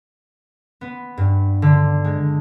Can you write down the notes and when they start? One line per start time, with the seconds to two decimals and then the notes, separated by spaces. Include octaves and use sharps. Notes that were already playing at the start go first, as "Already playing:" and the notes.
0.81 B3
1.17 G2
1.62 D3
2.04 G#3